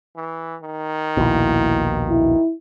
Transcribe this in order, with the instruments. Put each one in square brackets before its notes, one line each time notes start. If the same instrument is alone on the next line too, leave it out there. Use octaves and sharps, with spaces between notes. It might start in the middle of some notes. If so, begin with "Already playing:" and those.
[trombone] E3
D#3
[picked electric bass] A#1 D#2 B2 [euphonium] E4
[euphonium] E4